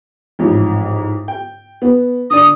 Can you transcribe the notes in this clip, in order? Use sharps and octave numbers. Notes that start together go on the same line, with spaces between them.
A1 F2 G#2
G5
B3
D3 D5 D#6